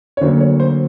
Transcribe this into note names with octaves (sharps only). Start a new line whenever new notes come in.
C#5
D2 D3 F#3 A#3 C5
C#5
C5